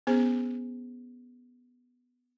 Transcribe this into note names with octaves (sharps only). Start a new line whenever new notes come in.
B3 C#4 G#4 C5